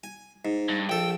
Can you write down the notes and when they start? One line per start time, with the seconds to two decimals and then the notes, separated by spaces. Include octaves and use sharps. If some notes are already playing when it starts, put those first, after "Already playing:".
0.04 G#5
0.45 G#2
0.68 G2
0.89 A#1 A4 G5